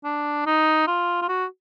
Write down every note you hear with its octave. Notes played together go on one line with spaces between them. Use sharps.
D4
D#4
F4
F4
F#4